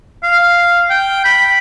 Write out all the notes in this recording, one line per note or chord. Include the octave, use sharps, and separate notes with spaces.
F5
G5
B5